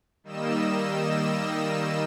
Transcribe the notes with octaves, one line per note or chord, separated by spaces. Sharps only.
D#3 G3 A#3 D#5 E6 E7